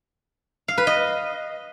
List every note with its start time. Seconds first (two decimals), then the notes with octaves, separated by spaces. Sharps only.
0.68 F5
0.78 B4
0.87 D#5